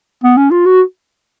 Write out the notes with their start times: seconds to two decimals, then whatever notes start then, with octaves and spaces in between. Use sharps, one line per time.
0.24 B3
0.37 C#4
0.51 F4
0.66 F#4